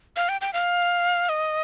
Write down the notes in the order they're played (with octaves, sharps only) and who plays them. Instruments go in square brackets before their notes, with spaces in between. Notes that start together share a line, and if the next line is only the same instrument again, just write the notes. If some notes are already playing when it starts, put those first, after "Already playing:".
[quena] F5
G5
G5
F5
D#5